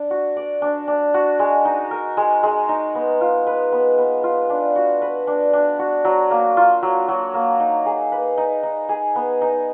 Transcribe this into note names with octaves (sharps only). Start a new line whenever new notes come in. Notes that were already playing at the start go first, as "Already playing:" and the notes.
Already playing: D4
F#4
D5
D4
D4
F#4
G#3
D#4
A#4
G#3
G#3
D#4
B3
F4
B4
B3
B3
F4
D4
F#4
B4
D4
D4
F#4
F#3
A#3
F4
F#3
F#3
A#3
D#4
G#4
B4
D#4
D#4
G#4
B3
D#4